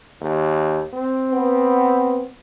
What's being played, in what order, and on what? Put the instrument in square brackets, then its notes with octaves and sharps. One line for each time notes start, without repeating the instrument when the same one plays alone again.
[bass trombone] D#2
C4
[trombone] B3